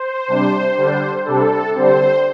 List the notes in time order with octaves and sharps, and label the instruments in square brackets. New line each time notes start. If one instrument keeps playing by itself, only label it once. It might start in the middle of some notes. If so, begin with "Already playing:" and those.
Already playing: [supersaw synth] C5
C3 G3 D4
D3 G3 D4
C3 G3 D4 A4
D3 G3 C4 C5